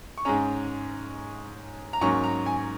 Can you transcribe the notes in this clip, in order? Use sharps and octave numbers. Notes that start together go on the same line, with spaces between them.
C#6
G#2 G#3 C#4 A#5
A#5
G#2 F#3 A#3 C#4 C#6
A#5
G#5